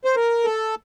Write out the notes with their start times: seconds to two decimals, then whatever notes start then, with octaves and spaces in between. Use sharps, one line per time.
0.05 C5
0.16 A#4
0.45 A4